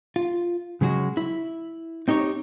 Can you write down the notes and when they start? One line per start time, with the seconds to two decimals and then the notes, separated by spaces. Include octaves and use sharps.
0.16 F4
0.81 C#3 F#3 G#3 F#4
1.17 E4
2.08 C4 D#4 G4 C#5